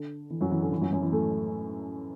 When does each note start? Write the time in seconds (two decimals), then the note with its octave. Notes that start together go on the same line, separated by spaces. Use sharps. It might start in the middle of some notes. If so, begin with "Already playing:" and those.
Already playing: D3
0.30 E3
0.41 F#2 F#3
0.51 E3
0.62 D3
0.72 E3
0.81 F#2 F#3
0.92 F#2 F#3
1.02 E3
1.12 A2 A3